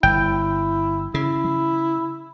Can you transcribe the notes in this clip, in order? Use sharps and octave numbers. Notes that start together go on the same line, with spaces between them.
G1 E4 G5
C#3 E4